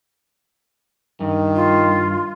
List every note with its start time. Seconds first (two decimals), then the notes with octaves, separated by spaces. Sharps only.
1.21 G2 D#3
1.55 F4